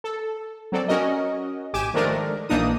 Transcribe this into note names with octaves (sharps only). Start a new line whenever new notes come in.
A4
F#3 C4 A4 D5
C#4 F#4 A#4 D#5
G#1 G4 G#5 D6 E7
D#3 F3 G#3 A3 D4 A#4
A#1 E3 A#3 D4 D#4 D#6